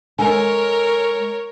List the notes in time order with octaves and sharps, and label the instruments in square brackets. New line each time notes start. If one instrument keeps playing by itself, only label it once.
[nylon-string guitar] G#3 A4 G#5 [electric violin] A#4 C#5